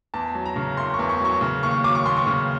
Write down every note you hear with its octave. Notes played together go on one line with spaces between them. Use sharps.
E2 A5
F#3
A#5
C#3
F#1 C6
C#6
E2
C#6
F#3 C#6
C#3
D#2 C#6
F#3 D6
C#6
D#2 C6
C#6
C#3